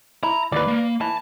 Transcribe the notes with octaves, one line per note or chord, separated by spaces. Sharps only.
E4 A#5
D#2 B4 D5
A#3
E3 A5